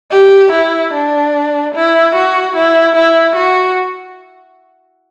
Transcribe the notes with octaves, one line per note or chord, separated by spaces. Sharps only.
G4
E4
D4
E4
F#4
E4
E4
F#4